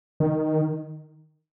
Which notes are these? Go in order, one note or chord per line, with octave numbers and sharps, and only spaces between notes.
D#3